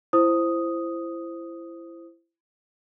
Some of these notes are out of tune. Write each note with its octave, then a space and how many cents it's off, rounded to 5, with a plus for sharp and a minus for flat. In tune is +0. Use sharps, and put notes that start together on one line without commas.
E4 +25 C5 +0 D#6 +0